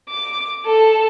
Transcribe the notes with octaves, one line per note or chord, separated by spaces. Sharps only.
D6
A4